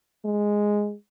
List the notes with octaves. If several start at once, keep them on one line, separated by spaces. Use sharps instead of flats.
G#3